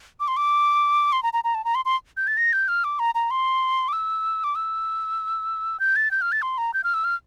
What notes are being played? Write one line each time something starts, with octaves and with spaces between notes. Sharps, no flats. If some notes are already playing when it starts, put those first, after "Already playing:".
D6
C6
D6
C6
A#5
A#5
A#5
A5
A#5
C6
C6
G6
A6
A#6
G6
F6
D6
A#5
A#5
C6
D6
E6
D6
E6
G6
A6
G6
F6
A6
C6
A#5
G6
F6
E6
F6